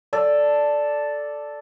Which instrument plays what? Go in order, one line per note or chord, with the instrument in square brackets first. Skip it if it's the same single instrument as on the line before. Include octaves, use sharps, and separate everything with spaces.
[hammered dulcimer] A4 D5